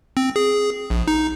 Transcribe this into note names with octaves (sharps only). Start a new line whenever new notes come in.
C4
G#4
A#1
D#4